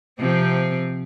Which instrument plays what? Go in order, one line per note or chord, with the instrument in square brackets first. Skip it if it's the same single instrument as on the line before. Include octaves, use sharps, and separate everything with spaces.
[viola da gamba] C3 F3 C4